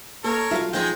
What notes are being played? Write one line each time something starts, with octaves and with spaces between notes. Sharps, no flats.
A#3 A4 A#4 C#5
F#3 F4 E5 F5
F3 G#3 D#4 G#4 G5